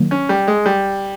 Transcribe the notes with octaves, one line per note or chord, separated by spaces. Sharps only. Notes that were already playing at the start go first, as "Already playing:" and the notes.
Already playing: D#3 F#3 A#3
C#4
G3
G#3
G3